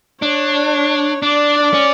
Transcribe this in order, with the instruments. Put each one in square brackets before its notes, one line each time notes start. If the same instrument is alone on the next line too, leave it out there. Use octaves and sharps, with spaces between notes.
[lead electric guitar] D4 [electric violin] C#5
[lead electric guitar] D4 [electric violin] D5
[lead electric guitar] C#4